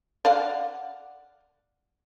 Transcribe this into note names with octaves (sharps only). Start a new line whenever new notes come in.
D5 F5 F#5